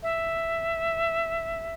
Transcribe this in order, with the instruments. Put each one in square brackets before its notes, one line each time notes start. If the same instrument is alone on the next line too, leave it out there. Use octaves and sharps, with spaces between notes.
[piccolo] E5